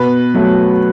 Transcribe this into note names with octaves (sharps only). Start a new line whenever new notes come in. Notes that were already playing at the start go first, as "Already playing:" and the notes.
Already playing: B2 B4
F#3 A3